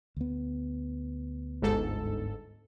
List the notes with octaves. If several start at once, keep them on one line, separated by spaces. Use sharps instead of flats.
D2 B3
G1 G#2 A4